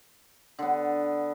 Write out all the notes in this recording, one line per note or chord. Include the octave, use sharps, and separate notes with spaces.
D3 B3